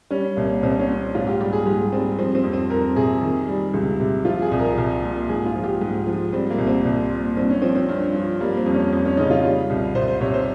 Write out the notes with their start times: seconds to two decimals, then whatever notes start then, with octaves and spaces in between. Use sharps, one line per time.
0.10 G3 C#4
0.36 C2 A#3
0.63 C2 C4
0.79 C#4
0.88 A#2
1.15 G#2 F4
1.27 G4
1.40 G3 G4
1.53 G#4
1.67 G#2 G4
1.92 G3 C4
2.17 F3 C4
2.35 C4
2.43 F2
2.53 C4
2.70 F2 A#4
2.96 C3 G#4
3.21 D#3
3.48 G3
3.73 C#2
4.00 C3
4.25 F3 F4
4.42 G#4
4.51 C2
4.59 A#4
4.78 C2
5.03 A#2
5.29 G#2 G#4
5.46 F4
5.55 F3
5.64 G4
5.81 G#2
6.06 F3
6.32 G3 C4
6.50 A#3
6.58 C2
6.67 C4
6.85 C2
7.10 A#2
7.37 G2 C4
7.50 C#4
7.62 F3 C4
7.75 C4
7.89 G2
8.15 F3
8.40 G3 A#3
8.57 C4
8.66 F2
8.74 C#4
8.92 F2
9.05 C#4
9.17 C#3 D#4
9.31 F4
9.43 G3
9.70 C2
9.95 C2 C5
10.08 C5
10.21 C3 C#5
10.34 C5